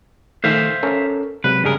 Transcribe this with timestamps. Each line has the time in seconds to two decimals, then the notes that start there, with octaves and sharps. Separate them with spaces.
0.44 D#3 A3 C5 E5 F5
0.83 C#4 A4 A#4
1.44 C3 F#3 G#3 B4
1.64 G2 C#3 G3 G#4 A#4